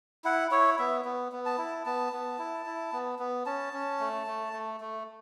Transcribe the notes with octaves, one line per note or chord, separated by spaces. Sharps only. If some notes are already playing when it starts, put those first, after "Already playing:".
E4 F#5
E4 C#5
B3 E5
B3
B3
A5
E4
B3 A5
B3
E4
E4
B3
B3
C#4 A5
C#4
A3
A3
A3
A3